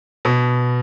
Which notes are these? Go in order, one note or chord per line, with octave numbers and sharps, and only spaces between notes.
B2